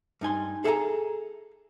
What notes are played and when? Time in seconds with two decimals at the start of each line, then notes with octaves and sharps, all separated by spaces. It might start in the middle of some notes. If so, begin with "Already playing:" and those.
0.21 G2 D#4 G#5 C6
0.64 G#4 A4 E5 F#5 G#5 A#5